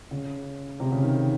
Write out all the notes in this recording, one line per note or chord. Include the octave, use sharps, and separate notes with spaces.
C#3
C3
C#3
D#3